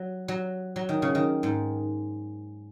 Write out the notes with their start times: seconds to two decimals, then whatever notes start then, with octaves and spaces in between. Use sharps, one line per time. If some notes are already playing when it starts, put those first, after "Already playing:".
Already playing: F#3
0.28 F#3
0.76 F#3
0.89 D#3
1.02 C#3
1.15 D#3
1.43 G#2